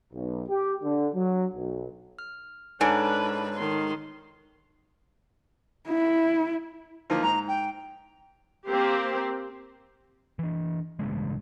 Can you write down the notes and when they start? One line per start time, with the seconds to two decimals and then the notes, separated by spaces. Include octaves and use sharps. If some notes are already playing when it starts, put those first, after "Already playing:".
0.13 B1
0.49 G4
0.83 D3
1.14 F#3
1.54 B1
2.19 F6
2.81 G#2 D4 A4 B4 C#5 D5 G#5 A5
3.57 D#3 C6
5.89 E4
7.10 D#3 F3 A#3
7.23 G#2 A#5
7.48 G5
8.68 A#3 C4 G4 C5
10.39 E3 D4
10.99 A1 G2 C#3 G#3